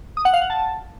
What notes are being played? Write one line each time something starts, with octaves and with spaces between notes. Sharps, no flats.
D#6
F#5
F5
F#5
A5